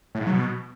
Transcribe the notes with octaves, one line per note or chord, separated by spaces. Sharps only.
A2
G#2
F#3
B2